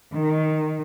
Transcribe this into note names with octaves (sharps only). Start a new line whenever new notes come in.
D#3